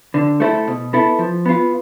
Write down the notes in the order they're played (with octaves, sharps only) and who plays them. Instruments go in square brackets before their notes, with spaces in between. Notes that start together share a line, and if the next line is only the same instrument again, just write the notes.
[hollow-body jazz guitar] D3
A3 E4 A4 C5
B2
B3 E4 A4
F3
B3 F4